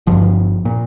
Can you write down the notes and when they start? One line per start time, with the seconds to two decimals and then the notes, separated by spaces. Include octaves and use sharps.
0.07 G1 G2 F3
0.65 A#2